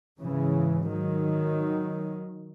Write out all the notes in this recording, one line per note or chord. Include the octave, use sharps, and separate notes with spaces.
G#2 C#3 E3
D#3 F#3